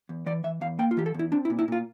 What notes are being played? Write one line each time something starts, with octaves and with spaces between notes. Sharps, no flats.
E2
E3 D5
E3 E5
E2 F5
A#3 G5
F4
E3 G4
A4
E2 E4
C4 D4
E4
A#2
E4
A#2 F4